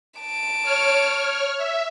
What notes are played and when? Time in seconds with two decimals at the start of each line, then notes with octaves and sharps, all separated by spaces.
0.20 A5 D7
0.62 C#5 F6
1.57 E5